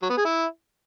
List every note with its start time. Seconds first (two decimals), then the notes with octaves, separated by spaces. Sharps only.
0.02 F#3
0.10 B3
0.17 G#4
0.25 E4